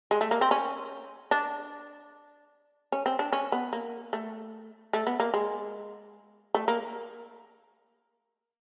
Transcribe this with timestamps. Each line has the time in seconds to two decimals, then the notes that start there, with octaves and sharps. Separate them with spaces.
0.11 G#3
0.21 A3
0.31 A#3
0.41 C4
0.51 C#4
1.31 D4
2.92 C#4
3.06 C4
3.19 D4
3.32 C#4
3.52 B3
3.73 A#3
4.13 A3
4.93 A3
5.07 B3
5.20 A#3
5.34 G#3
6.54 A3
6.68 A#3